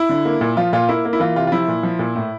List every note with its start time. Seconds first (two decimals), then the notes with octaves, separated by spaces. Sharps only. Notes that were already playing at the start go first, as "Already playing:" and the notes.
Already playing: E4
0.09 D3
0.25 A#3
0.41 A#2
0.57 F3 F4
0.73 A#2 F4
0.89 A#3 E4
1.05 A#3
1.13 E4
1.20 E3 F4
1.36 C3 F4
1.47 F4
1.52 F3 E4
1.68 A#2
1.83 F3
1.99 A#2
2.16 A2